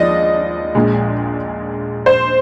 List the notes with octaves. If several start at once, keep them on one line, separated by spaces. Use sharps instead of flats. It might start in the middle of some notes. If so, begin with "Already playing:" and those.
Already playing: D#2 F3 G#3 D5 D#5
A#1 A#2 G#3
C5